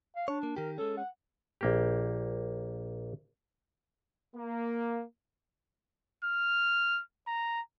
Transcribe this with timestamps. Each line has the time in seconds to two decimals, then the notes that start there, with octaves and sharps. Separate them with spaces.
0.16 F5
0.28 D4 C#5
0.43 A#3
0.56 D#3 G4 A#4
0.78 G#3 C#4 A4
0.97 F#5
1.61 A#1 A#3 G4
4.35 A#3
6.24 F6
7.27 A#5